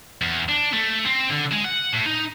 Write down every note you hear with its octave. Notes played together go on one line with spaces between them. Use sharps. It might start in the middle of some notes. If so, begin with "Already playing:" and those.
E2
D4
A3
C4
D3
G#3
F#5
A2
D#4